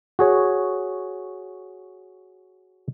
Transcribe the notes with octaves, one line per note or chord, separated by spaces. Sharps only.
F#4 G#4 C#5